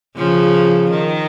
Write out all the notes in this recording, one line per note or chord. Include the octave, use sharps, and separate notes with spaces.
C#3 F3
D#3